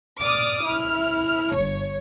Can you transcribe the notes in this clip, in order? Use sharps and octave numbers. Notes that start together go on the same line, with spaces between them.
D5 D6 D#6 F6
E4 F6
G1 C#5